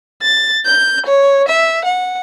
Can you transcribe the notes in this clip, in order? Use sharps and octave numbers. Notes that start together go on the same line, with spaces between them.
A6
G6
C#5
E5
F#5